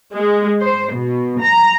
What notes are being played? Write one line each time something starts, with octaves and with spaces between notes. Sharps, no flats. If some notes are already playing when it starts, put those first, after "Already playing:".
G#3
C5
B2
A#5